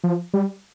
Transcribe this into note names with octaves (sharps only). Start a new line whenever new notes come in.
F3
G3